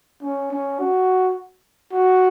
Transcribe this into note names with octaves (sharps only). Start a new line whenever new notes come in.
C#4
C#4
F#4
F#4